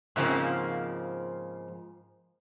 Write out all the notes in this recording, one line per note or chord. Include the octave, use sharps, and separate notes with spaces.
G#2 C#3 F3 A#3 C4